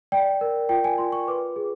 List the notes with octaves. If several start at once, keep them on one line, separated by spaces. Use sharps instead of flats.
D5 G5
A#4
F4 G5
G#5
F4 C6
C#6
B4 D6
G#4